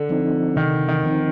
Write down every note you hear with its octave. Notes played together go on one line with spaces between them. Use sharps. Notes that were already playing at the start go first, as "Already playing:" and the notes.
Already playing: D3
F3 C4 D#4
C3 D#3
D#3
F3 C4 D#4